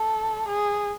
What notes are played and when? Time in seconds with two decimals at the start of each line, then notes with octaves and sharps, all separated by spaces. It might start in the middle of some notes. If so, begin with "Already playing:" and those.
Already playing: A4
0.48 G#4